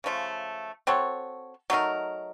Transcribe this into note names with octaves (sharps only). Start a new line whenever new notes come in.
C#3 F3 A3
C4 F#4 A4 C#5
F#3 A3 D#4 A#4